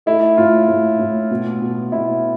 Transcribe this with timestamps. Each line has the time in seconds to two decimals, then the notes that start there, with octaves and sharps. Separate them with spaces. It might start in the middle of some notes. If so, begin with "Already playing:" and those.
0.06 A3 E4
0.37 A2 F4
0.68 A2
0.99 A2
1.31 B2
1.61 B2
1.92 B2 E4